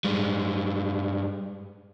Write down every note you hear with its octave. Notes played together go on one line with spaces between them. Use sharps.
G2 G#3